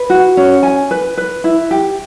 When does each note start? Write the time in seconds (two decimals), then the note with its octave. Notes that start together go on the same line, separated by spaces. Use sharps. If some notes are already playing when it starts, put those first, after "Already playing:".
Already playing: B4
0.10 F#4
0.37 C#4
0.63 G#5
0.91 B4
1.18 B4
1.44 E4
1.71 G4